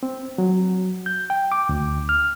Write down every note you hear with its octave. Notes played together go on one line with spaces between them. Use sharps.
C4
F#3
G6
G5
D6
D2
F6